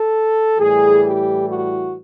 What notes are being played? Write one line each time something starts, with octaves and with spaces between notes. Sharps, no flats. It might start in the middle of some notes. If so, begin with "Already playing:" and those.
Already playing: A4
A2 E3 G3 G#4
G4
F#4